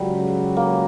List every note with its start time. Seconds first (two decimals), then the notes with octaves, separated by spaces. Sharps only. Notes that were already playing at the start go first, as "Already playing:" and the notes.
Already playing: C#2 C#3 F#3 G3
0.57 A#3